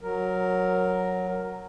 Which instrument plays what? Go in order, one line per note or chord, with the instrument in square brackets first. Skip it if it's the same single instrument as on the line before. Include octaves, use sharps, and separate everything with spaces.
[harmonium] F#3 A#4